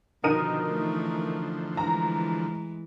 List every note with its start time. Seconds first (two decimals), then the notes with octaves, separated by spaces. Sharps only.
0.24 B2 D3 D#3 F3 D#4 A#4 D#7
0.69 D#3 E3 A3
1.77 E3 G#3 A#5